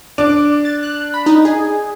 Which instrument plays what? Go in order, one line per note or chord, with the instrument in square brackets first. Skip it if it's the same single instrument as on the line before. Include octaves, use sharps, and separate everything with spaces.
[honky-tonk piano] D4 [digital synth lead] D6
[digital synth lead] A6
F#6
B5
D#4
G#4